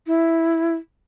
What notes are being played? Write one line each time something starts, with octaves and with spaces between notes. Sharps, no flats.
E4